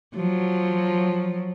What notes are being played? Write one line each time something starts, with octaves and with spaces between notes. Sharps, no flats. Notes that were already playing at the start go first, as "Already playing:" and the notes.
F3 F#3